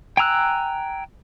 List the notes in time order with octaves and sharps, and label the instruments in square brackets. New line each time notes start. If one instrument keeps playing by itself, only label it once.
[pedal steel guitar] G5 G#5 A#5 E6 F#6